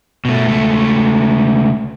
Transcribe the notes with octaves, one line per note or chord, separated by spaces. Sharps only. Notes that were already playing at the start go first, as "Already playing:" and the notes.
B2 A3
C#2 A3